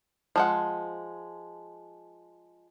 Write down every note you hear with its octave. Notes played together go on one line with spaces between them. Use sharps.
F3 G#3 F#5